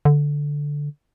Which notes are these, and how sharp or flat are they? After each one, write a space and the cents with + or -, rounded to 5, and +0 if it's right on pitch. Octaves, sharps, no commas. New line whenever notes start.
D3 -5